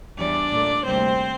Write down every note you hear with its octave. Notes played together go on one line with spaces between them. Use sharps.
E2 E3 G3 D4 D5
A#2 A3
D2 C3 G3 A#3 C4 C5